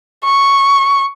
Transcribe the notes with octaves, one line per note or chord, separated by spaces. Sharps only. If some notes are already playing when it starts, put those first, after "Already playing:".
C#6